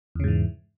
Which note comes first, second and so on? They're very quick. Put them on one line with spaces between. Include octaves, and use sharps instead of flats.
E2 C#3 G#2 E3